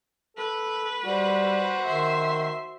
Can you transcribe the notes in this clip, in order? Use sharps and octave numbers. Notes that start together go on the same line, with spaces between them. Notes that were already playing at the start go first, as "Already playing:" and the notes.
A4 B4
G3 F#4 C5
D#3 E5 C6